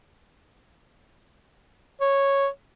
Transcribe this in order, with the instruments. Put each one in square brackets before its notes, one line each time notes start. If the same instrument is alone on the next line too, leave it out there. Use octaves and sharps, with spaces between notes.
[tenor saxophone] C#5